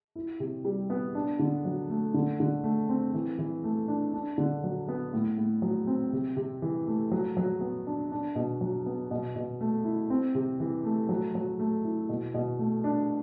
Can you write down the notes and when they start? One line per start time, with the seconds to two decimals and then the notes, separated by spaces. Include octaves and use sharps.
0.15 E4
0.40 C3
0.65 G3
0.90 B3
1.15 D4
1.39 D3
1.65 F#3
1.90 A3
2.14 D3
2.40 D3
2.64 A3
2.89 C4
3.14 E3
3.39 E3
3.64 A3
3.88 D4
4.14 D4
4.38 D3
4.64 F#3
4.89 B3
5.13 A2
5.38 A2
5.62 F#3
5.87 C4
6.13 C3
6.37 C3
6.62 E3
6.87 A3
7.11 F#3
7.37 F#3
7.61 B3
7.87 D4
8.12 D4
8.36 B2
8.61 F#3
8.86 B3
9.11 B2
9.36 B2
9.61 A3
9.85 E4
10.10 C4
10.35 C3
10.60 E3
10.85 A3
11.09 F#3
11.35 F#3
11.59 A3
11.85 E4
12.09 B2
12.34 B2
12.59 A3
12.84 D4